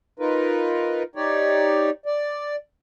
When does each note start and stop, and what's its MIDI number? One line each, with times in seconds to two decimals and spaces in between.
0.19 1.03 63
0.19 1.03 65
0.19 1.03 70
0.19 1.03 71
1.15 1.90 63
1.15 1.90 67
1.15 1.90 73
1.15 1.90 74
2.06 2.56 74